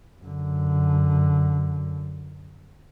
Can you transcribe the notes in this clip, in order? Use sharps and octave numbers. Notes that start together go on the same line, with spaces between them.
F#2 D3